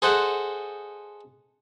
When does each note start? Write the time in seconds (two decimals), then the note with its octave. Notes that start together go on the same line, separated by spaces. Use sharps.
0.02 G#4 A4 C5 D#5 F#5